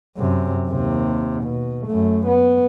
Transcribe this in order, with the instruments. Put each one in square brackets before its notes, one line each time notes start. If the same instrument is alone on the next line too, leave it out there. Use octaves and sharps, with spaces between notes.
[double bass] F#2 C3
D#2 C3
B2
F#2 A3
B3